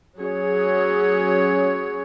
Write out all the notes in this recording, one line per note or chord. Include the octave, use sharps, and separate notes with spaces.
F#3 C#4 G#4 C#5